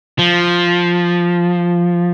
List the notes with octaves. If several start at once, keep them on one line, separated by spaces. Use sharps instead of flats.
F3